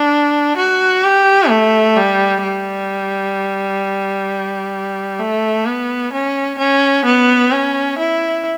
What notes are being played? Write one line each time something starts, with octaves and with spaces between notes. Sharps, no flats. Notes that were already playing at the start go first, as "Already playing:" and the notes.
Already playing: D4
F#4
G4
A3
G3
G3
A3
B3
C#4
C#4
B3
C#4
E4